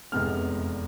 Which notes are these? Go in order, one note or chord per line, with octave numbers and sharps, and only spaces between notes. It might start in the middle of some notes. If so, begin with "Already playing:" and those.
F1 E2 C3 G#3 B3 F6